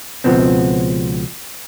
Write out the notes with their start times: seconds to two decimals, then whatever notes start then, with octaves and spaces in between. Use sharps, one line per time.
0.24 C#2 B2 F3 B3 C4